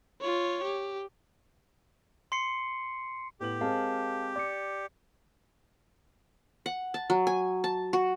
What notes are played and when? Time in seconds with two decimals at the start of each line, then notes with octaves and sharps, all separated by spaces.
0.21 F4 C#5
0.63 G4
2.32 C6 C7 C#7
3.40 A2 B3 G4 F#7
3.61 G#3 C4 G#4 A#4 F5 A5
4.36 D5 D6 C#7
6.66 F#5
6.94 A5
7.10 F#3
7.27 G#5
7.64 A5
7.93 F#4